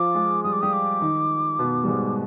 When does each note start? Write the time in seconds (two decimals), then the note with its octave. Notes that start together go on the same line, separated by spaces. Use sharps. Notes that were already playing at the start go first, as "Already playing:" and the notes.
Already playing: F3 F4 D6
0.15 G#3 G#4
0.43 G3 G4 D#6
0.53 D6
0.61 G3 G4 D#6
0.73 D6
1.01 D#3 D#4
1.59 B2 B3
1.84 G3
1.88 G#2 G#3